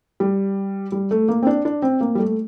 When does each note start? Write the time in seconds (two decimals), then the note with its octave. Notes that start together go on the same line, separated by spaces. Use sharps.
0.20 G3
0.92 G3
1.11 A3
1.28 A#3
1.42 C4
1.47 D4
1.65 D4
1.82 C4
2.01 A#3
2.15 G3
2.19 A3